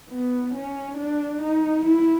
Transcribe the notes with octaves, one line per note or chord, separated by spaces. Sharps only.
B3
C#4
D4
D#4
E4